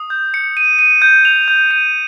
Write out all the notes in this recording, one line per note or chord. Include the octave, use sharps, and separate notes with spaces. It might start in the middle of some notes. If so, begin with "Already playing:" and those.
Already playing: D#6
G6
C#7
D#7
D#7
G6
F7
G6
D#7